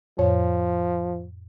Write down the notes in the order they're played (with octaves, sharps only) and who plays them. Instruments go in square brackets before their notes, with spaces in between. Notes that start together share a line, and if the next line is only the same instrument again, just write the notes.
[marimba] F2 A2 C#5 [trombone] F3